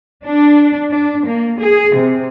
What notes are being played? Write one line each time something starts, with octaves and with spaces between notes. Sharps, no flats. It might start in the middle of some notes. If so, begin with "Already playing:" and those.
D4
D4
A#3
G#4
C3